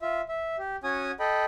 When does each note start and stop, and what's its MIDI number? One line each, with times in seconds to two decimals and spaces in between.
0.01 0.21 65
0.01 0.21 76
0.29 0.56 76
0.58 0.76 67
0.84 1.11 61
0.84 1.11 66
0.84 1.11 80
0.84 1.11 87
1.20 1.45 69
1.20 1.45 75
1.20 1.45 79
1.20 1.45 83